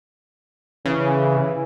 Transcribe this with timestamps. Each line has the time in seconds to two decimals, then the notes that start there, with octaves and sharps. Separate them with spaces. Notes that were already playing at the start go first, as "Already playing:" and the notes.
0.85 C#3 E3